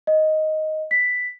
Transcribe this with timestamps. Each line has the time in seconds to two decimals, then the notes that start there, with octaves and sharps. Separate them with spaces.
0.07 D#5
0.91 B6